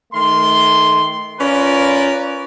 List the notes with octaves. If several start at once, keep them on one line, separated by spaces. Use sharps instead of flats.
D#3 A3 C6
C#4 F4 A#4 B4 D5